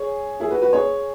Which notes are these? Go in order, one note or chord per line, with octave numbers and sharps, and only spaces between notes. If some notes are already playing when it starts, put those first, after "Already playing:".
Already playing: G#4 C#5
E4 G#4
F#4 B4
F#4 B4
G#4 C#5